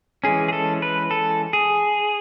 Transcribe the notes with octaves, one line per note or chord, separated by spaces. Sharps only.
E3 G#3 C#4 G#4
G#4
A4
B4
A4
G#4